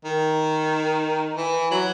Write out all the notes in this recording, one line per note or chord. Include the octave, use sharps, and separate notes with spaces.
D#3
E3
F#3